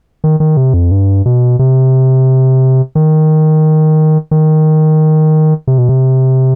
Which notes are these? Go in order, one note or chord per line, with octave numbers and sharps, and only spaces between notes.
D#3
D#3
C3
F2
G2
B2
C3
D#3
D#3
C3
B2
C3